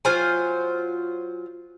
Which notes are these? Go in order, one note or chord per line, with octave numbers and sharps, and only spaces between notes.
F#3 F4 C5 G#5